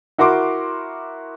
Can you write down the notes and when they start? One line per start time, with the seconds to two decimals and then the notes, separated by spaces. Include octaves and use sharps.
0.18 E4 F#4 A#4 C6 D6